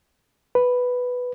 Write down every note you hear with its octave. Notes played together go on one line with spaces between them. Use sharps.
B4